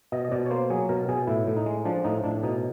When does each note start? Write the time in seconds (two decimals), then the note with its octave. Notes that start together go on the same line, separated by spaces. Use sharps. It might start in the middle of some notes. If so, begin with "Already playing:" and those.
0.12 B2 D#5
0.25 D#5
0.32 B2 D5
0.46 C#5
0.50 A#3 C5
0.70 F#3 G#4
0.89 B2 A#4
1.08 B2 G#4
1.27 A2 E4
1.47 A2
1.56 D#4
1.66 G#3
1.85 F3 D4
2.04 A2 D#4
2.24 A2 D4
2.43 B2 D#4